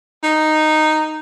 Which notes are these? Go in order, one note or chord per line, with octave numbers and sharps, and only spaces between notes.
D#4